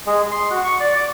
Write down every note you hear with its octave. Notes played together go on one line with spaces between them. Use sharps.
G#3
C6
F#4
C#6
D5
D6